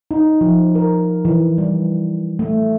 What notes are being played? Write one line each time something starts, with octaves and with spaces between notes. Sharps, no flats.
D#4
F3
A#4
E3
G3
A3